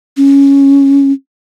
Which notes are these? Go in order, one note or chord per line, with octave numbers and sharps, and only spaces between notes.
C#4